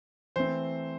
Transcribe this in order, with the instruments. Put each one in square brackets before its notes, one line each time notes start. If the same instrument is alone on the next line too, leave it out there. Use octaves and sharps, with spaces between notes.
[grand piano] E3 A3 C4 C5